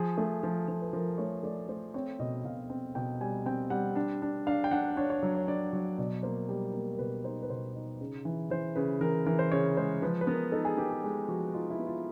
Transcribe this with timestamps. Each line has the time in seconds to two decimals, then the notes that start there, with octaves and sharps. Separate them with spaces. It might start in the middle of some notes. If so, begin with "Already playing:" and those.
Already playing: F3 G#4
0.18 A3
0.43 F3
0.68 F3
0.82 B4
0.93 F3 A#4
1.18 A3 C#5
1.43 A3 D5
1.69 A3 C5
1.94 C4 C#5
2.19 B2 D#5
2.44 B2 F5
2.70 C4
2.95 B2 G5
3.21 G3 G#5
3.46 C4 G5
3.70 G3 F#5
3.96 D4
4.22 D4
4.47 D4 F5
4.64 G5
4.71 D4 F#5
4.97 D4 C#5
5.10 C#5
5.23 F#3
5.35 C#5
5.47 D4 D5
5.73 F#3
5.98 B2 D5
6.23 A#3 C5
6.49 G3
6.74 A#3
6.92 A#4
6.99 B2 B4
7.24 D#4 C5
7.43 B4
7.50 B2 C5
7.75 D#4
8.01 C#3
8.25 E3
8.50 E3 C5
8.76 C#3 B4
9.01 E3 A#4
9.26 E3 A#4
9.39 C5
9.52 C#3 C#5
9.77 G#3 C5
10.02 F3 B4
10.21 B4
10.27 B3 A#4
10.52 D#4 A4
10.65 G#4
10.77 B3 G4
10.90 G#4
11.04 G#3
11.28 F3 F#4
11.54 D#4 F4
11.70 E4
11.79 B3
11.87 F4